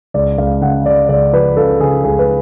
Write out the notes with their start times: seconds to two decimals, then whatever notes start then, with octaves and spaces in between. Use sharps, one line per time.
0.14 C#2 D5
0.38 C#2 F5
0.61 C#3 F#5
0.86 C#3 D5
1.09 C#2 D5
1.33 F3 B4
1.57 C#3 A4
1.80 C#3 G#4
2.04 C#2 G#4
2.19 B4